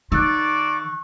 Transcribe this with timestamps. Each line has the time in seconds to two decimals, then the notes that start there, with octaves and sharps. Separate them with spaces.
0.12 D#3 A#3 A4 D5 C#6 E6 F#6